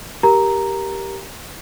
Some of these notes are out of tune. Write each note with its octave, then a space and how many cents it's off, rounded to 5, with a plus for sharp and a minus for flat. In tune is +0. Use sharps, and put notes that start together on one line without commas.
G4 +0 A#4 +10 A#5 +0